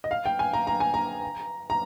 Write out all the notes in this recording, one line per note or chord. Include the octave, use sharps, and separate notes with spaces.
D#5
F5
G5
G#5
A#5
A#5
G#5
A#5
A#5